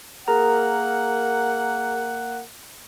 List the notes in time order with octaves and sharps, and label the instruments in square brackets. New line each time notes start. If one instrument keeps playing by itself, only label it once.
[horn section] A#3 F#5 [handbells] G#4 A#4 A#5